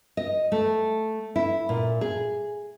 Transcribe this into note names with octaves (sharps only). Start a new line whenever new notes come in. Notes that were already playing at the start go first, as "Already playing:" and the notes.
D#5
A3
E4
A#2
G#4